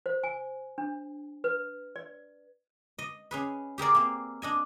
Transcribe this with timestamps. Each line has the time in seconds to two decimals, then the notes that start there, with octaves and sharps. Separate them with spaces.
0.06 C5
0.23 G#5
0.78 D4
1.44 B4
1.96 D5
2.99 D#5
3.31 C#4 G#4 B4
3.78 G4 G#4 A#4 D5
3.95 A#3 C4
4.42 D4 D#5 G#5